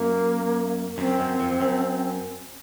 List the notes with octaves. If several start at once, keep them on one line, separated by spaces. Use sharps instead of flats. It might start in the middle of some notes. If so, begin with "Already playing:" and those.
Already playing: F#2 A#3
F#2 C4
F#2
F2
F#2